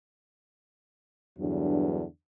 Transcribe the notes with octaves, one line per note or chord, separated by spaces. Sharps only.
E2 G2 D3 F#3 D4